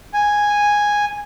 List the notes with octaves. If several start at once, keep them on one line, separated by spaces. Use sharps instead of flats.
G#5